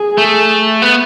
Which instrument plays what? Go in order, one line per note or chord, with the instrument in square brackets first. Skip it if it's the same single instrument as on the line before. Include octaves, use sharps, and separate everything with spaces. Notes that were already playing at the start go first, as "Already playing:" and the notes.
Already playing: [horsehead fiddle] G#4
[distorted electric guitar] A3
B3